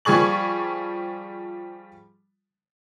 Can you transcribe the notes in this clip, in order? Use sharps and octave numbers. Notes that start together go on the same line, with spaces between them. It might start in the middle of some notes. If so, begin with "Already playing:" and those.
F3 G3 G#4 C#6 F#7